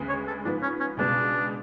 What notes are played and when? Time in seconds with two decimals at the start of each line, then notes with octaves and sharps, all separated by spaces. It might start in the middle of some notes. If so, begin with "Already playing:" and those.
Already playing: D2 C#3 G#3 B3
0.09 C#5
0.27 A4
0.44 G#2 F3 B3 D4
0.62 C#4
0.80 C#4
0.97 C#2 B2 G#3 B3 D4